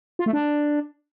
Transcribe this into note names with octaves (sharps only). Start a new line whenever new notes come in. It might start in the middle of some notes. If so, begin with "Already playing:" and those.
F4
A3
D4